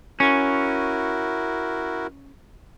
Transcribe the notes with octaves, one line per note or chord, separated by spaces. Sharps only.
C#4 E4 F#4 A#4